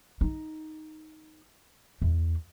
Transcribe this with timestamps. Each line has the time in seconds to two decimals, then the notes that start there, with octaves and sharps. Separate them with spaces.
0.21 D#4
2.02 E2